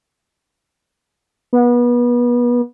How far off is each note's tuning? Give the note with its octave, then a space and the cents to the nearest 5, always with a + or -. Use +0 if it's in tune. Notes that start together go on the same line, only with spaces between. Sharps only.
B3 -30